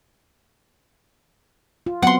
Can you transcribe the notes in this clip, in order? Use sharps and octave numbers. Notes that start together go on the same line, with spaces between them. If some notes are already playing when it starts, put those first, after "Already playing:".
F4
F#3 B3 C4 F#5 C6